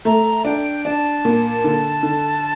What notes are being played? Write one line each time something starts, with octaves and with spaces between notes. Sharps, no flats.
A3 A#5
D4 G5
D4 A5
A#2
D3
D3